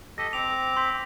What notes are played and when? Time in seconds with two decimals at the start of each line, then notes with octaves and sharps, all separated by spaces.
0.18 G4 A4 D#5 A#6
0.33 C4 D6 F7
0.77 C6 G6 B6